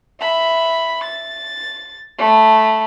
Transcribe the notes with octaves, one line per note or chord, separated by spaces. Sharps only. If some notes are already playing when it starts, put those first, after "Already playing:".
E5 B5
A6
A3 B5